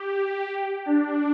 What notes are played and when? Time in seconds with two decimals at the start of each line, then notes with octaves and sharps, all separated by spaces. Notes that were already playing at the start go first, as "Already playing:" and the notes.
Already playing: G4
0.86 D4